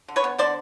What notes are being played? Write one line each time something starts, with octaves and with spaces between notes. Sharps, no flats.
D3
B4 C#5
B3
D3 C5 D5